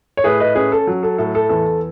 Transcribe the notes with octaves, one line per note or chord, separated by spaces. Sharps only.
C#5
A2 G#4 B4
B4 D#5
C#4 G#4 B4
A4
F#3
A4
A2 A4
A4
E2 A4